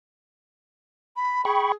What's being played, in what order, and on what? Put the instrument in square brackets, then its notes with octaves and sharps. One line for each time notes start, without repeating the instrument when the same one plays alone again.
[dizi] B5
[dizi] G#4 [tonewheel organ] G5 B5 C#6